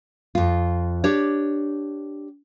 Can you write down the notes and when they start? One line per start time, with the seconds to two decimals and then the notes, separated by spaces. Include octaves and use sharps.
0.35 F2 F4
1.04 D4 G4 C#5